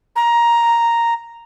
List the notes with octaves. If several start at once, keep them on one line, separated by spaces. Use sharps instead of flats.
A#5